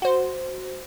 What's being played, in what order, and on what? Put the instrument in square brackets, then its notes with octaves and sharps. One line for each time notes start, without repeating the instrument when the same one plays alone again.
[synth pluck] F#4 C5